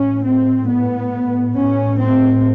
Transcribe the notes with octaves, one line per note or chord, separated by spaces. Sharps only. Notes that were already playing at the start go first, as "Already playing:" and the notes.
Already playing: A2 C#4
C4
B3
A2 C#4
C4